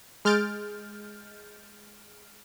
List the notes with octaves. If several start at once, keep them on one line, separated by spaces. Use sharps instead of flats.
G#3 F6 G6 A6 D7